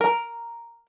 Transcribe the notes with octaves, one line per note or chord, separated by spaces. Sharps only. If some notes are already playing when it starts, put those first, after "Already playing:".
A#4